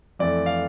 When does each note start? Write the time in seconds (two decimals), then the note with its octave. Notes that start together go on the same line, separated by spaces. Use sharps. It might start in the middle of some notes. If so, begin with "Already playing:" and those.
0.19 F2 E3 A3 D5
0.46 F5